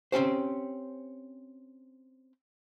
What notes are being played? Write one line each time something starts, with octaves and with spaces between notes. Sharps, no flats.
C4 C#4 G4 C5